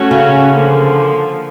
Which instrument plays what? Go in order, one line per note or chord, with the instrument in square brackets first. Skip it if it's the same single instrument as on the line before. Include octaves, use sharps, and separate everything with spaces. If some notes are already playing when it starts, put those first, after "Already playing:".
Already playing: [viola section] A3 C#4 F#4
[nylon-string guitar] C#3
[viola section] D3 F3 A#3